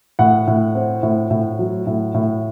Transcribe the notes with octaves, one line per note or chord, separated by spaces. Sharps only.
A2 F#5
A2
C4
A2
A2
F#3
A2
A2